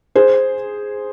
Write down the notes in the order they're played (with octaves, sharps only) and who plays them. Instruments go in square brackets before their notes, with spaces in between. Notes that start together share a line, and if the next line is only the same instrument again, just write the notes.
[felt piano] G#4 C5